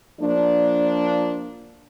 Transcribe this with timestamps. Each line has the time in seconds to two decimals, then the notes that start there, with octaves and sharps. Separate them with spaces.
0.21 F3 A#3 D4